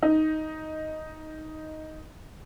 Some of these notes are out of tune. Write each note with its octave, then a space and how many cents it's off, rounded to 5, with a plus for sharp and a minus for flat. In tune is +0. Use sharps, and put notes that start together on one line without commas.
D#4 +5